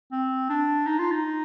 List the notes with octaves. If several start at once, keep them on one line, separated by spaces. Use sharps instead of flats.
C4
D4
D#4
F4
D#4